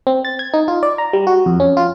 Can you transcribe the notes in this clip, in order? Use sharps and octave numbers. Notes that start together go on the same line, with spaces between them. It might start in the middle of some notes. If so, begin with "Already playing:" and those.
C4
A6
G#6
D#4
F4
D5
A#5
G3
F#4
F2
C#4
F4